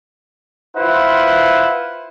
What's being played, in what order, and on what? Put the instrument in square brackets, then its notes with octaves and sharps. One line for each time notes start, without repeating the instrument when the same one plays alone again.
[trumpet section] E4 F4 B4 C5 F#5